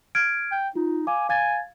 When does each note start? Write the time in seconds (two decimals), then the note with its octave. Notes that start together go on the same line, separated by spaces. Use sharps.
0.15 F6 G#6 D7
0.51 G5
0.76 D#4 F4
1.07 F5 G#5 D6
1.29 F5 G#5 G#6 A6